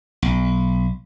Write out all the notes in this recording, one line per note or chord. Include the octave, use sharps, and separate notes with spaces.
B1